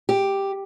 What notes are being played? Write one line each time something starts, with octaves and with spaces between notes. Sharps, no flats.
G4